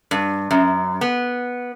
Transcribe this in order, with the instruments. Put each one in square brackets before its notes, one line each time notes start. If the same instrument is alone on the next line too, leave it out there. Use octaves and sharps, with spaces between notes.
[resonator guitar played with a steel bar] G2
F#2
B3